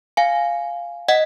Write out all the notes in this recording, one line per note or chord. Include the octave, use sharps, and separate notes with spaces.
F5 G#5
D#5 F#5